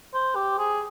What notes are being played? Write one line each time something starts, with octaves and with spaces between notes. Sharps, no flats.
C5
G4
G#4